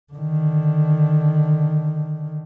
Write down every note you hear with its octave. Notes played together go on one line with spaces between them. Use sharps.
D3 D#3